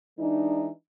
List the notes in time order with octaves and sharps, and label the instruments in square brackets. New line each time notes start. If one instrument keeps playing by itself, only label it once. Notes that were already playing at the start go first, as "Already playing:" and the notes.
[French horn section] E3 G#3 D4 D#4